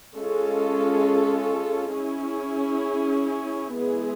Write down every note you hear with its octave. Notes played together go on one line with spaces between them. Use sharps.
G#3 C#4 F4 A4
C#4 E4 G#4
E3 G#3 B3 E4 G#4